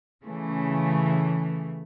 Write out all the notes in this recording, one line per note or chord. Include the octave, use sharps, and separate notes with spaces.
C#3 E3 A3